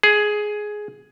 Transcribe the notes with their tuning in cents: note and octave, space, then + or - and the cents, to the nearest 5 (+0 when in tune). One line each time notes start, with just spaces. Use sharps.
G#4 +10